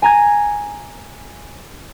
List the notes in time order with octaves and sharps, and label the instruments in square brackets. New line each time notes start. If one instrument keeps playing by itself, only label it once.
[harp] G#5 A#5 G#6